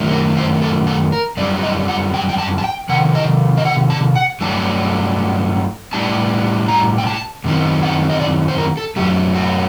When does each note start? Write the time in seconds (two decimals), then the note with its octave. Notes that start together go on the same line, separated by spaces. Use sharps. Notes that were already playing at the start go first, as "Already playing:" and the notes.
Already playing: F#2 D#3 A3 D4
0.11 A#4
0.37 C5
0.62 A4
0.87 A4
1.12 A#4
1.37 F#2 D3 G3 D4 D5
1.63 D#5
1.88 F#5
2.14 G5
2.29 G5
2.38 A5
2.58 A5
2.64 G5
2.89 C3 D#3 F#5
3.15 D#5
3.58 D#5
3.65 F#5
3.90 A5
4.16 F#5
4.41 G2 F#3 A3 D4 A5
5.93 A2 G3 D4 A5
6.68 A#5
6.98 G5
7.07 A5
7.44 F#2 D#3 C4 D#4
7.83 F#5
8.09 D#5
8.20 D5
8.48 C5
8.58 A#4
8.77 A4
8.96 F#2 F#3 A3 G4
9.34 F#4